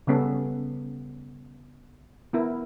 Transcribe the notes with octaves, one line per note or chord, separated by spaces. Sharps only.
C#3 G3 B3 C#4 A4
B3 E4 A#4